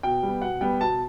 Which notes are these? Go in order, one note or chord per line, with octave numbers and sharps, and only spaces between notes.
B2 G5
G3 B3
B2 F#5
G3 B3 G5
B2 A5